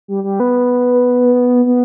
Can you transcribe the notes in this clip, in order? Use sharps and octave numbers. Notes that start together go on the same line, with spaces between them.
G3
G3
B3
B3